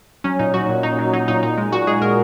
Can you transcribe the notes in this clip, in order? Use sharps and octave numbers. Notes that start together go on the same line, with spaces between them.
F#3 C#4
A#2 D#4
F#3 F#4
A#2
F#3 D#4
F#3
F#3 D#4
A#2 D#4
A#2 D#4
G#3
A#2 F#4
G#3 G#4
A#2 A#4